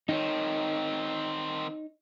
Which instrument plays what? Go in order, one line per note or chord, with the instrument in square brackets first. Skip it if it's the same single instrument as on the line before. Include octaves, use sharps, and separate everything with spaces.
[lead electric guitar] D#3 C4 [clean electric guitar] D#4 C#5